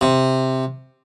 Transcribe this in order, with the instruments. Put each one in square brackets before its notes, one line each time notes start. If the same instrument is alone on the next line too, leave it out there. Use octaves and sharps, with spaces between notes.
[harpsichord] C3